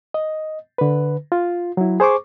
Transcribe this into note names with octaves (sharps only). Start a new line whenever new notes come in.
D#5
D3 B4
F4
F#3 E4
G#4 C5 C#6 D6